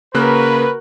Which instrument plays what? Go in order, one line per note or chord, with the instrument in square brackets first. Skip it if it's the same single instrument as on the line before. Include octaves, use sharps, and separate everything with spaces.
[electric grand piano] C#3 A#3 F#6 [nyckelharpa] F#4 A#4 [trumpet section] B4